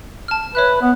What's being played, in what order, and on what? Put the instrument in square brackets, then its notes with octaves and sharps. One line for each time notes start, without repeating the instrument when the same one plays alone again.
[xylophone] A5 F6
[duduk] B4 [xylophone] C#5 E5 F#6
[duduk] B3